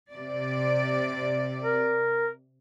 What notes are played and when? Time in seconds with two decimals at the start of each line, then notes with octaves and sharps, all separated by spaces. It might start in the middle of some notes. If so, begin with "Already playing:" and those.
0.13 C3 D5
1.61 A#4